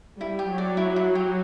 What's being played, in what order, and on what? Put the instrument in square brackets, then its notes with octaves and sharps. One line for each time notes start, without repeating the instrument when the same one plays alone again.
[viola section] G3 [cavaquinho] E4
[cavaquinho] G4
[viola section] F#3
[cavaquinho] D5
E4
E4
G4